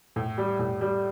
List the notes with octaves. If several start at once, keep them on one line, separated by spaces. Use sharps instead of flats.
A2
G3
A2
G3